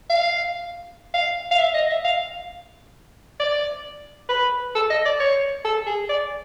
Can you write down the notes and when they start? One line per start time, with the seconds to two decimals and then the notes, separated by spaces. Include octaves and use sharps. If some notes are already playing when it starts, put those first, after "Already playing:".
0.10 F5
1.14 F5
1.51 F5
1.59 E5
1.74 D#5
1.90 E5
2.04 F5
3.39 D5
4.29 B4
4.75 A4
4.90 D#5
5.05 D5
5.20 C#5
5.65 A4
5.87 G#4
6.09 D5